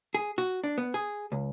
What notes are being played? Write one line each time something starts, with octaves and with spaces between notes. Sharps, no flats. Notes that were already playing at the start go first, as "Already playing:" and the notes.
G#4
F#4
D4
B3
G#4
C#2